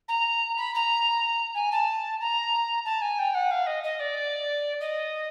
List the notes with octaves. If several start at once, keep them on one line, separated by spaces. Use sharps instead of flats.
A#5
B5
A#5
G#5
A5
A#5
A5
G#5
G5
F#5
F5
D#5
D#5
D5
D#5